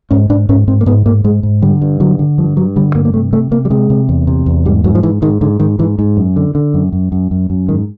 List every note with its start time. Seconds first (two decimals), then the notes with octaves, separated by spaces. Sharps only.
0.11 G#2 C#4
0.30 G#2 D4
0.49 G#2 C#4
0.67 G#2 C4
0.81 A#3
0.86 G#2 B3
1.06 G#2 A#3
1.24 G#2 G#3
1.43 G#2
1.62 D3 G3
1.82 G2
2.00 D3 F#3
2.19 D3
2.38 G2 F3
2.57 G2 F#3
2.76 D3 G3
2.95 G2 A#3
3.05 A#3
3.14 C3 A3
3.32 C3 A3
3.51 C3 A#3
3.65 G3
3.70 C3 G#3
3.90 C3
4.09 E2
4.27 C3
4.46 E2
4.66 G#2 G3
4.84 G#2 F#3
4.95 F3
5.03 G#2 E3
5.22 G#2 D#3
5.41 G#2 D3
5.60 G#2 D#3
5.79 G#2 E3
5.99 G#2
6.17 F#2
6.36 D3
6.55 D3
6.74 F#2
6.93 F#2
7.12 F#2
7.31 F#2
7.50 F#2
7.69 G#2 D#3